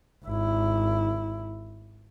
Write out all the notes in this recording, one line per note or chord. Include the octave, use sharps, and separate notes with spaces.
G#1 E4